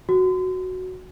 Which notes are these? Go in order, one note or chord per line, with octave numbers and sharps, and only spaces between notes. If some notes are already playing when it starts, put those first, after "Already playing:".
F#4